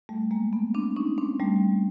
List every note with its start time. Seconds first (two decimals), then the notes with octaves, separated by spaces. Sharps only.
0.09 G3 A3
0.31 G#3 A#3
0.53 A3 B3
0.74 C4 D4
0.96 C#4 D#4
1.18 C4 D4
1.39 G3 A3